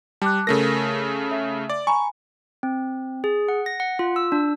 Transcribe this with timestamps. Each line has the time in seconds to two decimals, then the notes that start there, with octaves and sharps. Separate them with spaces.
0.22 G3 A5 D6 F#6
0.47 C#3 A3 A4 A#4 A#6
1.31 E5
1.70 D5
1.87 G#5 A#5 B5 C#6
2.63 C4
3.24 G#4
3.48 F#5
3.66 A#6
3.80 F#5
3.99 F4
4.16 E6
4.32 D4